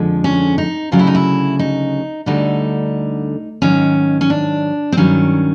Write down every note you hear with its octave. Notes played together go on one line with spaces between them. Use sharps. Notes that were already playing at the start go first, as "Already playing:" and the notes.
Already playing: F2 D3 F3 G#3
C#4
D#4
D2 C#3 F#3 F4
E4
D#4
E4
D#4
D2 D3 G3 D#4
G#2 D#3 F#3 C#4
C#4
D4
C4
G2 D#3 F#3 C#4